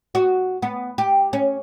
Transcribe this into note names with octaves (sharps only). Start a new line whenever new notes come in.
F#4
B3
G4
C#4